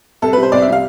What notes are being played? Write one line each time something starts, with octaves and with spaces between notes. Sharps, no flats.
C2 A4
C3 G3 B4
C5
C2 D5
E5
C3 G3 F5